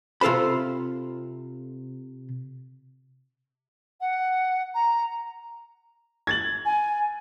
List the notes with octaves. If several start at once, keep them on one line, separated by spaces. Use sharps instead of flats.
C3 F4 A4 C5 B5
F#5
A#5
G#6 A6 F#7
G#5